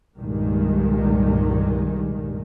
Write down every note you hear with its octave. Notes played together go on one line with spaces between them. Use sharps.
C2 G2 A#2 D#3 G#3